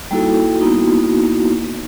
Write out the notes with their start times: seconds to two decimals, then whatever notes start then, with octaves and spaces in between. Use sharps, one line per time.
0.11 G3 A#3 D#4 E4 F#4 A4
0.59 A#3 B3 D#4 E4 F#4